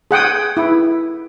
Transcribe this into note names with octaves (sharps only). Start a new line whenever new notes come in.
G#4 F#5 G5 D#6
E4